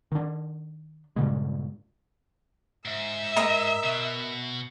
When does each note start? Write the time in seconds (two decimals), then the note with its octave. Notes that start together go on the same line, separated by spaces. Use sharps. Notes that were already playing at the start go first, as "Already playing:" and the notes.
0.12 D#3 D4
1.16 G2 A#2 C#3 G#3
2.85 G#2 E5
3.36 A#4 D#5 A#5
3.84 B2